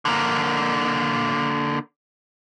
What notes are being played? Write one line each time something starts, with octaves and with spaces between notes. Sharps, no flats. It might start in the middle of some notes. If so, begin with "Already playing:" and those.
D3 A#3